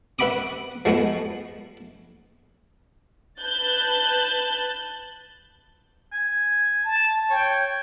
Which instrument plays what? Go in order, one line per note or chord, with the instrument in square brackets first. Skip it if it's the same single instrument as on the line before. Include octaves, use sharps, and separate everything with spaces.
[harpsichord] B4 E5 F#5 B5 D6 D#6
F3 G#3 A3 B3
[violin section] B4 A5 F#6 G6 A6
[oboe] G#5
[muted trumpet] A5
[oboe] C#5 [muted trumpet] G5